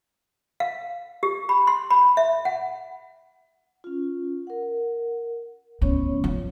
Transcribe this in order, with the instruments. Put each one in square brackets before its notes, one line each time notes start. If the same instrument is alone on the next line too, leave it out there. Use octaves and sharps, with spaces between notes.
[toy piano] F5
G4
B5
C6
B5
E5
F#5
[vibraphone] C#4 F4
A#4 F#5
[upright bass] D2 A2 [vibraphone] B3 C#4 C#5
[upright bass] F3